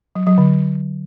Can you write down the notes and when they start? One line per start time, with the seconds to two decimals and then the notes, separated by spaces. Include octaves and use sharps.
0.15 F#3
0.27 F#3
0.38 D3